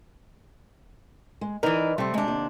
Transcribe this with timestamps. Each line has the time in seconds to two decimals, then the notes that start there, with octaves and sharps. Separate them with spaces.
1.41 G#3
1.63 E3 D#4 A#4 B4 D5
1.98 C3 G3 A3 C4
2.14 C3 G#3 D4
2.28 D#2